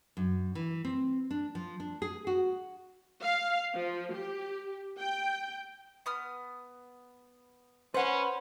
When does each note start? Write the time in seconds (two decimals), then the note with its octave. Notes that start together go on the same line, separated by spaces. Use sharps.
0.17 F#2
0.55 E3
0.85 C4
1.31 D4
1.55 F3
1.80 D4
2.02 G#4
2.27 F#4
3.22 F5
3.75 F3
4.13 G4
4.99 G5
6.06 B3 D#6 F6
7.94 C#4 B4 C5 F#5